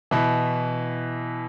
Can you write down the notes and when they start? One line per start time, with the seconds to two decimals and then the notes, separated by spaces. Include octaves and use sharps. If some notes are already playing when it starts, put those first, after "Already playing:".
0.11 B2 E3